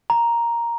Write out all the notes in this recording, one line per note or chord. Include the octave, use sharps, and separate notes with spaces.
A#5